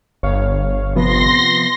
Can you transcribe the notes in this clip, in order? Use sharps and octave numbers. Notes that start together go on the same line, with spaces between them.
G1 C#5 F5
C3 F3 B3 C6 A#6